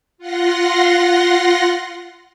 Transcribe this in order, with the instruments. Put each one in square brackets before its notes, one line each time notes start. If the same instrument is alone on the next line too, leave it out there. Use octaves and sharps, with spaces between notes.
[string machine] F4 F#5 C6 A#6